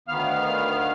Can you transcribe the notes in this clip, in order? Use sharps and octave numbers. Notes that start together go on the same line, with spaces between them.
D2 D#3 B3 F5 F6